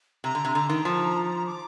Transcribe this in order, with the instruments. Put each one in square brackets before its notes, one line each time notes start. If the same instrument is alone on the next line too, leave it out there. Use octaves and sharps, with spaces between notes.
[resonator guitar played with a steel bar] C3 [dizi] A#5
[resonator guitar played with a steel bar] D3
C3
[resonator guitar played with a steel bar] D3 [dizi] A#5
[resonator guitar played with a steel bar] D#3
F3
[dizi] D6